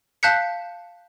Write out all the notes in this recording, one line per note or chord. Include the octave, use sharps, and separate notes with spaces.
F5 A5 F#6 G6 B6 C#7